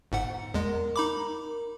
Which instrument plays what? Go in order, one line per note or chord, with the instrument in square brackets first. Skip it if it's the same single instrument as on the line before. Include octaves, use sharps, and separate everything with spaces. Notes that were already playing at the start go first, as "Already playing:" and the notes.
[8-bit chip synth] G1 G#2 F#5
[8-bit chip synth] E2 G#3 [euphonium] A#4
[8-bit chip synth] D#4 B5 D6